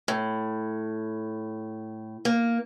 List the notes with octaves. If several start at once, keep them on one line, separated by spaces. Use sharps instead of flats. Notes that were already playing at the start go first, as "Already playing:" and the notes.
A2
A#3